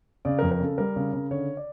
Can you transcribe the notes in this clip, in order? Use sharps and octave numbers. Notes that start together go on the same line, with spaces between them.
C#3 D5
A#4
F2
A#4
C#3 A4
G3 A#4
C#3
C#3
D3 C#5
D5